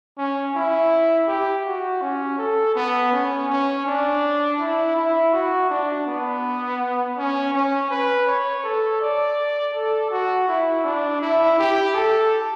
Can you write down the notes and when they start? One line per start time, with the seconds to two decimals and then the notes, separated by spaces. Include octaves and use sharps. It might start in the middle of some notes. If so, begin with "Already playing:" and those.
0.18 C#4
0.55 E4
1.28 G4
1.66 F#4
2.02 C#4
2.38 A4
2.75 B3
3.12 C#4
3.49 C#4
3.86 D4
4.59 E4
4.96 E4
5.33 F#4
5.70 D4
6.07 B3
7.17 C#4
7.54 C#4
7.90 B4
8.27 C#5
8.64 A4
9.01 D5
9.75 A4
10.11 F#4
10.48 E4
10.85 D4
11.22 E4
11.59 G4
11.95 A4